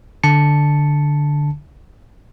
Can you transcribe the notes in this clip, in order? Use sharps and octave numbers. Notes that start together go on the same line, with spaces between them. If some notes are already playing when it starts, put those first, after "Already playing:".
D3 A5 C#7